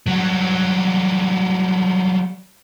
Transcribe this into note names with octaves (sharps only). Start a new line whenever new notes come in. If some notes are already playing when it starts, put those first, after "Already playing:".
F#3 G3